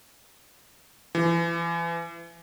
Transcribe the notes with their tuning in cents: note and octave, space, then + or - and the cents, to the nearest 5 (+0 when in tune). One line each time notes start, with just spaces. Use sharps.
E3 +35